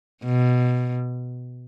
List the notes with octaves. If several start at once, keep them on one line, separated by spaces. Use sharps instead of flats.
B2